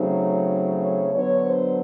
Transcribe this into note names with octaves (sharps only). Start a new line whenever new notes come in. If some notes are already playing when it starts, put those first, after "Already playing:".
Already playing: C#3 F#3 A3 C4 D#4
C#5
D3 F#3 B3 D4 C#5
C5